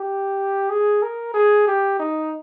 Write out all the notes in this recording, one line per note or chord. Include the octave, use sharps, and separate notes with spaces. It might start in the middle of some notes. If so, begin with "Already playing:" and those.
Already playing: G4
G#4
A#4
G#4
G4
D#4